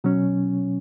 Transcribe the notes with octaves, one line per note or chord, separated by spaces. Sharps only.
B2 F#3 C#4